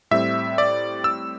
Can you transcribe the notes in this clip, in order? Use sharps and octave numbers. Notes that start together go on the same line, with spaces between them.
A2 G3 C4 E5
D5
E6